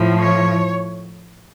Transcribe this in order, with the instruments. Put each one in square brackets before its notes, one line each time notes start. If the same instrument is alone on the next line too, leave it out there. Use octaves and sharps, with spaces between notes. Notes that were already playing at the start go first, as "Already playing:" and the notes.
Already playing: [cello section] A2 F3
C#5